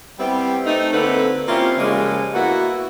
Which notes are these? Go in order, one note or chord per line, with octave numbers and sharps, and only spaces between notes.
G3 B3 C4 E4 G4
A3 C4 D#4
D3 A#3 C4 F#4 A4 B4
A#3 C4 C#4 E4 F4 G4
C#3 F3 G3 G#3 A#3
A#3 B3 E4 F#4